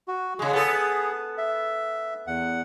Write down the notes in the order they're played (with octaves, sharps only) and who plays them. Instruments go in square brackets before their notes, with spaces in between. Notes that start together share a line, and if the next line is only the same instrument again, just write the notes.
[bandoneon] F#4
[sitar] C#3 G#3 [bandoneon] G#4
[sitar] B3 A4 [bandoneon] G#4
[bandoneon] E5
E2 F#5